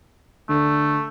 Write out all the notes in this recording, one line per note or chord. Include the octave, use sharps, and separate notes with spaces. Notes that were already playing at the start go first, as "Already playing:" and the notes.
D3 A3